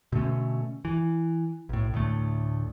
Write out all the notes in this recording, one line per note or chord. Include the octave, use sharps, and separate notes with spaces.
B2 D3 A3 C#4
E3
B1 A2
D2 A2 A3